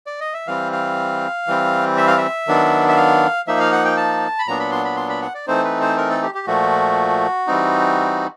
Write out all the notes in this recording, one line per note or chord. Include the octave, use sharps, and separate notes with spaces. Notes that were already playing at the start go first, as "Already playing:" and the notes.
D5
D#5
E5
E3 G3 C4 F5
F5
E3 G3 C4
E5
F5
E5
D#3 F#3 B3 D4
E5
F5
F3 A#3 D#4 E5
F5
F#5
G5
A5
B5
A#2 F#3 B3 D4 A#5
B5
C6
B5
C6
B5
F#5
D5
E3 A3 C4 D#4 C5
B4
C5
A#4
A4
G4
G4
A#2 F3 A3 F#4
E3 G3 C4 D#4